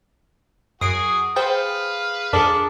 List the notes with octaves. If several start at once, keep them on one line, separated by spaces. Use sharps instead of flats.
F#2 F#4 G#4 D#6 C7 D7
G#4 B4 C5 F5 G5
F2 D4 G#4 A#4